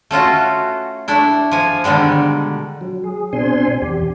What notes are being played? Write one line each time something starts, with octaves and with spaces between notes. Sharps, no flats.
A3 C#4 F4 F#4
A3 D4 E4
F3 G#5
B2 D3 D#3 G3 G#3
F#3
G#4
B2 C4 D4 G#5 C6
E2 G4